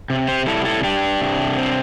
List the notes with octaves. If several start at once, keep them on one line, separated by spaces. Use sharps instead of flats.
C3
G4 C5
G3 E4 A4
E4 A4
G3 D4 G4
C3
C4